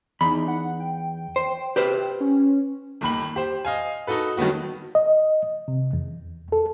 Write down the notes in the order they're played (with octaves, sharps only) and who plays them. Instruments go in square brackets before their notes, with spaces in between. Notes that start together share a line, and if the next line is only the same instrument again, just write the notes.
[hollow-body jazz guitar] E2 B5 [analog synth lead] D#4
[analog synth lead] F#5
G5
[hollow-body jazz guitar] C5
G4 B4 C5
[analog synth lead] C#4
[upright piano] G1 D#2 B5 F#7
G4 C5
D#5 F5 G#5
D#4 F#4 A4 B4
G2 D#3 F#3 B3 F#4
[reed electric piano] D#5
C3
E2
A4